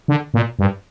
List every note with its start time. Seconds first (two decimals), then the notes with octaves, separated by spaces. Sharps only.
0.08 D3
0.34 A#2
0.59 G2